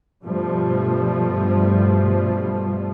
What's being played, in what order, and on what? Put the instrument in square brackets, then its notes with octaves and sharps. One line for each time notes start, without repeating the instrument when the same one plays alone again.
[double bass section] G2 B2 F3 G3 A3